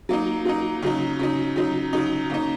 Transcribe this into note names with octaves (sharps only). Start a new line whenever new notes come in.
F#3 A#3 D#4
F#3 A#3 D#4
C#3 F#3 D#4
C#3 F#3 D#4
C#3 F#3 D#4
C#3 F#3 D#4
C#3 A#3 D#4